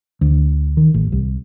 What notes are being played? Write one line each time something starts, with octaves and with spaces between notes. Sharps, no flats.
D2
D#3
A1
C2